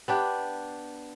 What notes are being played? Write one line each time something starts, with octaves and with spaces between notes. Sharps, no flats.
B3 D4 G4